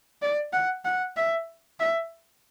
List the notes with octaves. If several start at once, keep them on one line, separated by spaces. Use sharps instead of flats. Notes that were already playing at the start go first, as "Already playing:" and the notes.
D5
F#5
F#5
E5
E5